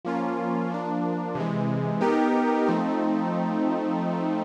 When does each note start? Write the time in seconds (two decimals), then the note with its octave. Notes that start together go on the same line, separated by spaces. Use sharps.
0.05 F3 A#3 C#4 F4
0.70 F3 A#3 D4
1.35 C3 E3 G#3
2.01 B3 D#4 G4 A#4
2.66 F3 A3 C4 D#4